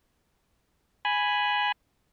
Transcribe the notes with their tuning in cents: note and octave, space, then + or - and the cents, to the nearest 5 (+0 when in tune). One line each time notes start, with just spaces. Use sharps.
G#5 +0 B5 +0